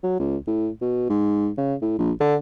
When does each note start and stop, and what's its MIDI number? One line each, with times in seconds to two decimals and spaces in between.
0.03 0.16 54
0.19 0.36 37
0.47 0.68 45
0.81 1.08 47
1.09 1.49 44
1.57 1.74 49
1.82 1.94 45
1.98 2.11 34
2.20 2.35 50